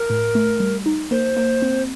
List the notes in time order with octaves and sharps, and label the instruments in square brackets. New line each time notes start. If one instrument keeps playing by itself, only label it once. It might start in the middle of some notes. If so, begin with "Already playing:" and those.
Already playing: [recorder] A#4
[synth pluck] A2
A3
G3
D#4
[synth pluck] A#3 [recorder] C5
[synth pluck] A#3
C4